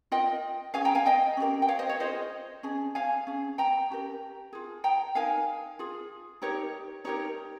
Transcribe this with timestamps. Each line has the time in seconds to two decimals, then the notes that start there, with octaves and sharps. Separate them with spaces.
0.12 F4 A#4 D#5 G5
0.74 C#4 G#4 F5 G#5
0.85 G5 A#5
0.95 F5 G#5
1.06 D#5 G5
1.37 C#4 G4 A#4
1.62 G5
1.68 C#5 F5
1.79 C5 D#5
1.89 C#5
2.00 F4 G#4 C5 D#5
2.63 C#4 G#4
2.95 F5 G#5
3.27 C#4 G#4
3.58 G5 A#5
3.90 C#4 G4 A#4
4.53 F4 G#4
4.84 G5 A#5
5.15 D#4 A#4 F5 G#5
5.79 F4 G#4
6.42 D#4 G4 A#4 C#5
7.04 D#4 G4 A#4 C#5